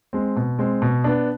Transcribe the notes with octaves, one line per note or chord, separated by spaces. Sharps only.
G#3 C4
B2
G#3 C4
B2
B3 D4